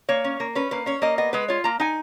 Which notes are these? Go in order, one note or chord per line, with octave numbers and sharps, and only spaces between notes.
A#3 C#5
C#4
A#3
C#4 B4
A#3 B4
C#4 C#5
A#3 D#5
B3 D#5
G#3 B4
F4 C#5
A#3 A#5
D#4 G#5